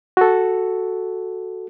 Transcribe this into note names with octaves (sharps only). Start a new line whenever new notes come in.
F#4 A4